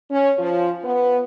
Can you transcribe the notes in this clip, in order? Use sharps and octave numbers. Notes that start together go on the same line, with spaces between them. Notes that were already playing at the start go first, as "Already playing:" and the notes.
C#4
F3
B3